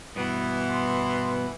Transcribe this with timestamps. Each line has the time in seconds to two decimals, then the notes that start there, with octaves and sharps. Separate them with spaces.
0.16 G2 B2 E3 B3
0.70 C6